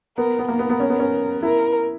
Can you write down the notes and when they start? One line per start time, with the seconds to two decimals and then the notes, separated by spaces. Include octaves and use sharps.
0.17 B3 A#4
0.39 B3
0.49 A#3 A#4
0.59 B3
0.70 B3
0.80 C#4
0.90 B3
0.99 C#4
1.43 E4 A#4